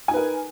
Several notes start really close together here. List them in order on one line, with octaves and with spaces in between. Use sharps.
G#5 D#4 B4 A#4